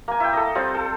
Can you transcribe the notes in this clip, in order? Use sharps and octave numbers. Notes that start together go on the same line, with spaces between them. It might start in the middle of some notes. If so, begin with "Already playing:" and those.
A#3 G#5
E4 G5
A4 D#5
G3 C4 F4 C5
A4